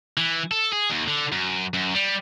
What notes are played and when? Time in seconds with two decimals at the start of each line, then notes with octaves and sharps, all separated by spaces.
0.17 E3
0.51 A4
0.73 G#4
0.91 D#2
1.08 D3
1.32 F#2
1.74 F#2
1.95 G3